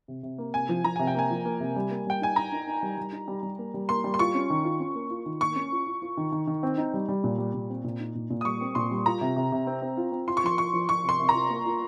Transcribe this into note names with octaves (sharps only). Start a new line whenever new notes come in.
C3
C3
A#3
C3 G#5
F3
F3 A#5
C3 G#5
G5
A#3 G#5
F3
A#3
C3
G3
A#3
G3 G5
D#4 G#5
D#4 A#5
D#4
D#4
G3
G3
D#4
G3
G3
A#3
G3
A#3 C6
G3
C6
F4 C#6
C#4
D#3
F4
C#4
A#3
F4
D#3
A#3 C#6
C#4
F4
F4
F4
D#3
D#3
D#3
C4
D#4
G3
G3
A#2
G3
A#2
C4
A#2
D#4
A#2
A#2
D#6
G3 C#6
C4
A#2 C6
G3
F4 A#5
C3
C3
C3
C4
C4
F4
C4
F4 C6
C#6
F3 C6
F4 C#6
F3
F3 C#6
C3
C6
C3
A#5
F4
A#3
F4